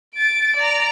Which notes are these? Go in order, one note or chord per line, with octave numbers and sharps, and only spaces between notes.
A6 D7
D5 A#5